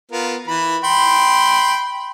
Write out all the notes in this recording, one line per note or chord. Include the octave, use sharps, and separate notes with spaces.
B3 F4 A#4
E3 B5
G5 B5 C6